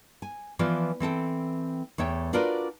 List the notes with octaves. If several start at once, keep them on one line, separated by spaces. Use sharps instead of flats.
G#5
E3 F3 B3 F4 D5
E3 C4 A4 G5
E2 A3 C#5 G5
D4 F4 F#4 A#4 B4 D5